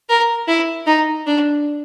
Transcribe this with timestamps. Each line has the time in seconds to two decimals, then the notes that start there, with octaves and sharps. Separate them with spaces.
0.09 A#4
0.48 E4
0.87 D#4
1.27 D4